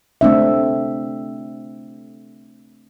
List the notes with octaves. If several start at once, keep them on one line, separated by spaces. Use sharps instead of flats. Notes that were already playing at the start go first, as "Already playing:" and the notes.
A3 C4 D4 E5